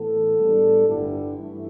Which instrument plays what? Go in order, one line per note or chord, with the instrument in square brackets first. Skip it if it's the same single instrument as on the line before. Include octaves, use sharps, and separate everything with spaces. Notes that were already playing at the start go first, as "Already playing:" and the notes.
Already playing: [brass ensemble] A2 E3 B3 A4
A2 G3 B3 D4
G1 G2 D3 G3 D4 E4
G2 E3 A3